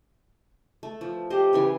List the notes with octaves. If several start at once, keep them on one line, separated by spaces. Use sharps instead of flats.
A3
F3
G4 C5 D#5
C#3 E3 G#5